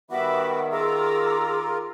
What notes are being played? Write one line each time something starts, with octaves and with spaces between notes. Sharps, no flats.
D#3 G3 B3 F#4 E5 F#5 B5 D6
F4 G#4 A#4 A#5 D6 E6